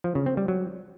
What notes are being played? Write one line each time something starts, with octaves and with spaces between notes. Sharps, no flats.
F3
C#3
C4
G3
F#3